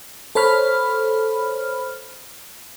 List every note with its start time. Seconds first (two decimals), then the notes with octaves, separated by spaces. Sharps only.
0.35 A4 C5 C#5 B5 F6